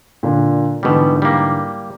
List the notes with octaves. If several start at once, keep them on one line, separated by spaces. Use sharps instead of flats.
A#2 D3 D4
G#2 B2 D3 E3 G3
G3 A#3